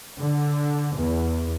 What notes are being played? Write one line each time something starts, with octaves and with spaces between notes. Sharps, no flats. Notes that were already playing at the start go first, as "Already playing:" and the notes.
D3
E2